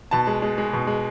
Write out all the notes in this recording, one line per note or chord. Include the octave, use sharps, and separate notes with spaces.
B2 A5
G#3
G#3
G#3
B2
G#3